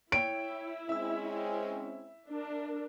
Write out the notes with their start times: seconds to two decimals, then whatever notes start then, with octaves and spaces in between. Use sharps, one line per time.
0.12 E4 C#5 G5 D7
0.89 G#3 C4 C#4 E5 E6
2.28 D4 A#4